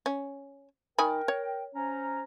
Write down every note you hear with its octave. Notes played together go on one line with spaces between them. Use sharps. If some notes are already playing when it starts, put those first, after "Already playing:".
C#4
D#3 A#4 G5 G#5 B5
C#5
C#4 C5 A#5